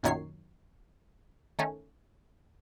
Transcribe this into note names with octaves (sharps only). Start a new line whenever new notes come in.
B1 F#2 A#2 D#3 C#5 C7
D#3 A3 C#4